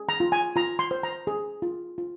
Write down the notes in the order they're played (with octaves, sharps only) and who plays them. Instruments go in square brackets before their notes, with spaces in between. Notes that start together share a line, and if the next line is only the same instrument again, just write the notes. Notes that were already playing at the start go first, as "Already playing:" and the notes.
Already playing: [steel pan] G#4
A#5
F4
G#5
F4 A#5
C6
C5
A#5
G#4
F4
F4